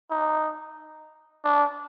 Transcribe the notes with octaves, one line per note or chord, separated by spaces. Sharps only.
D#4
D4